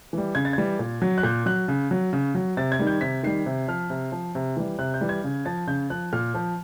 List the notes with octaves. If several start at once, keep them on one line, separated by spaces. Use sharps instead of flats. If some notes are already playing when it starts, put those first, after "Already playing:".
E3 G3
C#3 G#6
A6
E3 G3 G#6
A#2
F#3
F#6
A#2 G6
F#3 F#6
C#3
F#3
C#3
F#3
C3 A6
G#6
D#3 G3
G6
C3 B6
D#3 G3 C7
C3
F3 F6
C3
F3
C3
E3 G3
C3 F#6
G6
E3 G3
G#6
C#3
F3 A6
C#3 G6
F3 F#6
A#2 F6
F3